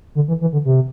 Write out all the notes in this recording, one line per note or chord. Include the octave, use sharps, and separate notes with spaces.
D3
E3
E3
D3
C3